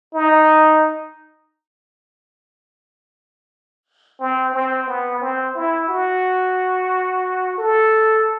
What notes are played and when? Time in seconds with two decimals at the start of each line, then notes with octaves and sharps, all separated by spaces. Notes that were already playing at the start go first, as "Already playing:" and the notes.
0.14 D#4
4.20 C4
4.54 C4
4.88 B3
5.21 C4
5.55 E4
5.88 F#4
7.58 A4